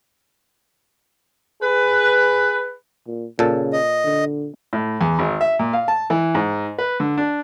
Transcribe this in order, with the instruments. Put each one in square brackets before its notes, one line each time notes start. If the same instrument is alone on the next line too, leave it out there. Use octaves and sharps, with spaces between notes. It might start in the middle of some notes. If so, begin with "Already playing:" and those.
[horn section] G#4 B4
[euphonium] A#2
[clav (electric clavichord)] A#2 A4 [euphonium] C#3
[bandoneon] D#5
[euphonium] D3
[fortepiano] A2
E2
G#1
E5
A#2
F5
A5
E3
G#2
B4
D3
D4